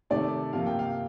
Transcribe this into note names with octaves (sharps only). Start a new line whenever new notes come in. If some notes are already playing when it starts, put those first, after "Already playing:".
C3 D#3 A3 D5
C3 F3 A#3 F5
G5
F5